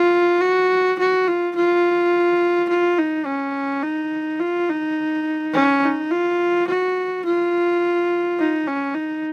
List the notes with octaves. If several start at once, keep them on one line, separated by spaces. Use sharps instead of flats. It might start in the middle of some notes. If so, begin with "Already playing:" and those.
Already playing: F4
F#4
F#4
F4
F4
F4
D#4
C#4
D#4
F4
D#4
C#4
D#4
F4
F#4
F4
D#4
C#4
D#4